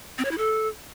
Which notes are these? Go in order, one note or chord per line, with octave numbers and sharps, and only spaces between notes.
C4
C#5
E4
A4